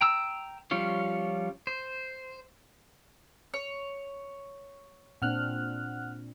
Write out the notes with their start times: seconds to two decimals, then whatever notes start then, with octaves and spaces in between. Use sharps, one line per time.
0.01 G5 A#5 E6
0.71 F3 G3 C#4 F4 C#5
1.67 C5
3.54 C#5
5.22 A#2 C4 D4 F#5 F6 F#6